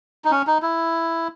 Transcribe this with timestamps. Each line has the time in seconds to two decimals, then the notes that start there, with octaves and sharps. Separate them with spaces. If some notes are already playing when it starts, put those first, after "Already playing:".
0.25 D#4
0.31 C#4
0.47 D#4
0.63 E4